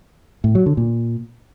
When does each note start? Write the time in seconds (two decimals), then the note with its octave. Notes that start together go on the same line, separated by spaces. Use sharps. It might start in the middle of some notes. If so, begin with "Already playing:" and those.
0.44 A2
0.55 F#3
0.66 D3
0.77 A#2